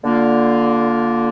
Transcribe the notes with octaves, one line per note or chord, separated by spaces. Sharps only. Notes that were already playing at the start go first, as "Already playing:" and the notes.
D3 A#3 F4